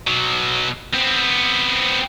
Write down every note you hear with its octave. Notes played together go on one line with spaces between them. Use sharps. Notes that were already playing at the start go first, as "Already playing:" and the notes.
B2 F#3
B3 C4